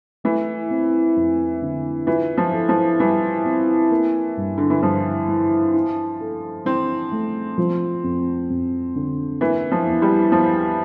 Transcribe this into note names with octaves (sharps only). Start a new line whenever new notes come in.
E3 A3
C4
F2
D3
E3 F4
F3
A4
F3
E3 G3
C4
A#3
G2
D3
E3
G2 F3
E3
E4
A4
E3 C4
A3
F3
F2
F2
D3
E3 A#3
F3
E2
G3
E2 F3